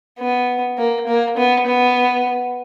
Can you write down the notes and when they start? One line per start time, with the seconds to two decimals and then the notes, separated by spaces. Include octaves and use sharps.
0.19 B3
0.78 A#3
1.07 A#3
1.37 B3
1.66 B3